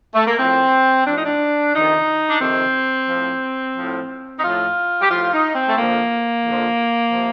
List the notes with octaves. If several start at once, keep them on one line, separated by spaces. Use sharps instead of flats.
A3
A#3
A2 F3 C4
A2 F3 D4
D#4
D4
F2 C3 D#3 D#4
D4
F2 C3 D#3 C4
A2 F3
A2 F3
D#4
A2 F3 F4
G4
A2 F3 F4
D#4
C4
A3
F2 D3 F3 A#3
F2 D3 F3
C3 F3